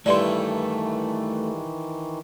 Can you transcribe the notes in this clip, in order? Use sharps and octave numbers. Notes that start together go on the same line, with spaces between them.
G2 D#3 E3 G3 A3 E4 D5 C6